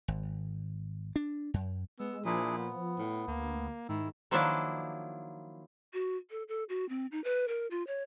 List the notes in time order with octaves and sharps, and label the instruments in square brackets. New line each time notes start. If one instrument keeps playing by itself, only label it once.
[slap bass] G#1
D4
F#2
[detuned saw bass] G#3 [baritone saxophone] B3 [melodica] E6
[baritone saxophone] A#2 [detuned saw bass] F3 [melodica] D4 E4 G#4
[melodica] B3
[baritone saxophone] A2
[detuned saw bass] D2 [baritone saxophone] A#3
[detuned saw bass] G#2 [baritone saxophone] D#3 [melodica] E4 E6
[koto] D#3 F3 F#3 A#3 D4 E4
[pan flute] F#4
A4
A4
F#4
C4
D#4
B4
A#4
F4
C#5